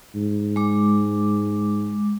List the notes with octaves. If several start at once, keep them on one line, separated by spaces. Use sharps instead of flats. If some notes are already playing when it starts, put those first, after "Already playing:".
G#2
G#3 D6